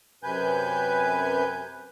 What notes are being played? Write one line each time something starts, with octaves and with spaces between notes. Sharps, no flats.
F#2 C3 B4 G#5 G6